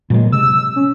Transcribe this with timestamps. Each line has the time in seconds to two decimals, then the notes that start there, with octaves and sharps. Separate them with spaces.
0.10 A#2 F#3 G#3
0.32 C3 E6
0.76 C#4